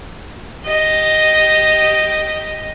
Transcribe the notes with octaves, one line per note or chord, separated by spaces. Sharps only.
G4 D#5